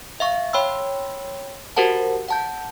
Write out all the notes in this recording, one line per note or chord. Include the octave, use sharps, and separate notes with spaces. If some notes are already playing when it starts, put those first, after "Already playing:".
E5 F5 C#6
C#5 G5 B5 C6 E6
F#4 G4 A#4 C5 F#5 A5
F#5 A5 G6